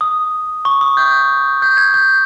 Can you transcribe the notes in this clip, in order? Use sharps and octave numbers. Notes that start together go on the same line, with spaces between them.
D#6
C#6
D#6
G6
G6
G#6
G6